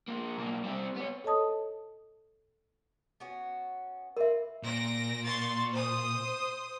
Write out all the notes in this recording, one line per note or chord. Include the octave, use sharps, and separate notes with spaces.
F3 A#3
B1 A#3
G3 C4
B3 C#5
A4 C#5 D#5 A5 D#6
B3 C#4 F#4
F4 A#4 B4 E5
A#2 A#6 D7
C6 C#6 A6
C5 D#6